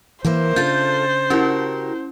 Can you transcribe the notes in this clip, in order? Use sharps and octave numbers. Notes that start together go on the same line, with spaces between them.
E3 A#3 A#4 C5 E5
C#3 D4 F4 A4 G6 A6
C#4 E4 F#4 G4 A#4